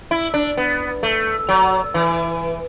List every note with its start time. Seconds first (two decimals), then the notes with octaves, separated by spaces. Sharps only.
0.11 E4
0.34 D4
0.57 B3
1.03 A3
1.49 F#3
1.94 E3